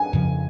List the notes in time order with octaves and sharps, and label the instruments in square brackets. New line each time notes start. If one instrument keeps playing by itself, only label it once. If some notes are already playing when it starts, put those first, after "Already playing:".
Already playing: [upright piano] G#5
[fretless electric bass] F2 C#3 F3